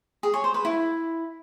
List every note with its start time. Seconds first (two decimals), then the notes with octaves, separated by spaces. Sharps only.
0.23 G#4
0.34 C#5
0.44 C5
0.54 B4
0.65 E4